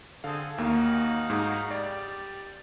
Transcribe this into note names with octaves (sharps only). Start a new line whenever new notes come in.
D3 C4 G#4 A4 F5
D#2 A#3 D#4 F#4 F5
G#2 G#4
G3 D5